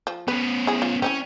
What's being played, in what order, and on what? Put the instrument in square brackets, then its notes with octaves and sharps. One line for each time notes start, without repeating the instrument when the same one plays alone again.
[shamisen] F3
[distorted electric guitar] B3 C#4 [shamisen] B4
[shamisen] E4 G#4
F4
[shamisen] C4 D#4 E4 [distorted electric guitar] C#4